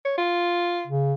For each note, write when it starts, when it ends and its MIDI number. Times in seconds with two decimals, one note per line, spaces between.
0.05 0.13 73
0.18 0.85 65
0.87 1.14 49